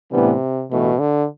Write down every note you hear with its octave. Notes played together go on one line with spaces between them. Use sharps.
A2 C3 E3 G3 B3 D4
A1 G2 B2 E3 A3
D3